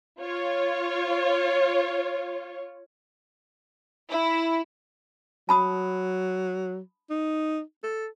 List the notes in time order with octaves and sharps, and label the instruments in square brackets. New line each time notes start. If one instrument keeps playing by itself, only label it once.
[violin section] F4 C#5
[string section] E4
[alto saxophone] F#3 [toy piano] A5 B5 D#6
[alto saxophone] D#4
A4